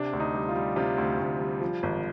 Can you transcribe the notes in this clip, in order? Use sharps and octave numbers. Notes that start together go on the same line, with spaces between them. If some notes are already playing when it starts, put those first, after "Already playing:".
Already playing: C3 D4
D2
D#4
G3
F4
G3
C3 F4
D2
D2
G3
F3
G#1